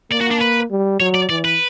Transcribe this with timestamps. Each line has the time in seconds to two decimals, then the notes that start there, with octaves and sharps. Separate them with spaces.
0.11 A#3 D5
0.21 F#4
0.31 D4
0.41 B4
0.70 G3
1.00 F#3 C#5
1.15 D5
1.29 E3 D5
1.45 B4